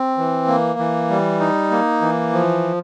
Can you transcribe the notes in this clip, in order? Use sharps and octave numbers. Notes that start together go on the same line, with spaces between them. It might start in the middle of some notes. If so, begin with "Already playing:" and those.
Already playing: C4
E3
A#3
E3
G3
D#4
A#3
E3
F3